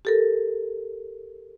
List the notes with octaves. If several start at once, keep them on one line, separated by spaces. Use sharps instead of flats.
G4 A4 A#4